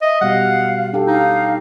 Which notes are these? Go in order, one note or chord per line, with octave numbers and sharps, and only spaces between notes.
D#5 E5
B2 G3 F5 F#5
D4 G4 A4
D#4 F5